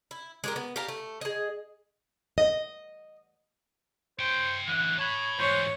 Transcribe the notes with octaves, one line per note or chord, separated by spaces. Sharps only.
E4
G#3 G4 A#4
B3
G4 F5 A5 A#5
A3
G#4 D#5
D#5
C5 C#5 G5
D3 E3 F#5
C#5 A5 B5
G#2 E3 C5 C#5